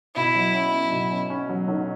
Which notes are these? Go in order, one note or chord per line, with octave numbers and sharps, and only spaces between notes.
B2 E4
F#3
C#4
C#4
B2
C#4
C#4
F#3
B1